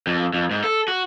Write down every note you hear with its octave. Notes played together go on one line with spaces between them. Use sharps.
F2
F2
G#2
A4
F#4